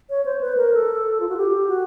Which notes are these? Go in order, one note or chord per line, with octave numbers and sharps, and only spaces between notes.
C#5
C5
B4
A#4
A4
F4
F#4
G4
F#4